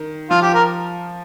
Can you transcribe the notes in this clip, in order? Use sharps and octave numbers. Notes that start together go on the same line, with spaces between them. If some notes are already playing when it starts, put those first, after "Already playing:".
Already playing: D#3
F3 F4
G4
A#4